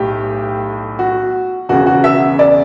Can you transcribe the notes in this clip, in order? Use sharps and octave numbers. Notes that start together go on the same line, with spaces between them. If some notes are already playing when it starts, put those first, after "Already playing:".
Already playing: B1 A2 G4
F#4
E1 E2 C#3 F#4
F#4
E5
D5